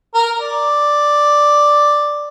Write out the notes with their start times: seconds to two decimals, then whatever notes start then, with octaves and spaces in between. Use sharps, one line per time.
0.15 A#4
0.40 D5